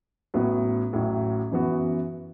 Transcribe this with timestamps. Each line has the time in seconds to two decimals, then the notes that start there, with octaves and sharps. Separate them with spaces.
0.34 A1 A2 F#3 B3 F#4
0.93 A1 A2 F#3
1.51 F#2 E3 B3 F#4